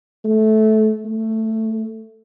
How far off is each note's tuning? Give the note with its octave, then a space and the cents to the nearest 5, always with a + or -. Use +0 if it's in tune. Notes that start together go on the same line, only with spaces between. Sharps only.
A3 -15
A3 +10